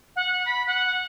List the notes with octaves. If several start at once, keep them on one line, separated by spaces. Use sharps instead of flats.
F#5
B5
F#5